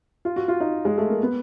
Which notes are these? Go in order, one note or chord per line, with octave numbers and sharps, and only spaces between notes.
F4
F#4
F4
D#4
G#3
A3
A#3
B3